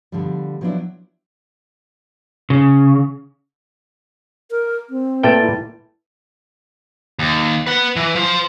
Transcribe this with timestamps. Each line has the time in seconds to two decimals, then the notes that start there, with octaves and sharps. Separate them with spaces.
0.12 B2 D3 F3 G3
0.61 F3 F#3 B3 C4 D4 E4
2.50 C#3
4.51 A#4
4.90 C4
5.23 A#2 A3 B4 G5 A5 A6
5.40 E4
7.19 D#2
7.67 B4 F#5
7.96 E3
8.15 F3 C5